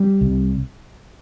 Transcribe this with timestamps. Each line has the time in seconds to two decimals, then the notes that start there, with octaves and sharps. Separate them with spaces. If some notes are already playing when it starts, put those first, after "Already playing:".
Already playing: G3
0.21 C2